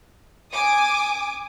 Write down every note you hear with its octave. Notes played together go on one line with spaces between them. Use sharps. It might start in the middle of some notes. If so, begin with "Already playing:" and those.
G#5 D6 D#6